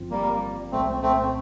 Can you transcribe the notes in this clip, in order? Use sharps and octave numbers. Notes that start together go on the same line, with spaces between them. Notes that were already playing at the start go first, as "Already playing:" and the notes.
Already playing: G1 G2 F3 C4 F4
G3 A#3
C2 A#2 G3 A3 C4
A3 C4